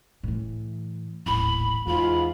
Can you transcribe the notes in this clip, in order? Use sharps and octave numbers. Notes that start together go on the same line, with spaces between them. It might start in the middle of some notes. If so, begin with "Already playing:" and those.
A2 E3
D#1 A1 B5
E2 G#2 G#3 F4 B5